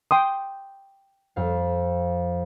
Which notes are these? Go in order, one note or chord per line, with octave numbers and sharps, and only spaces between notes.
G5 C6 D#6
F2 F5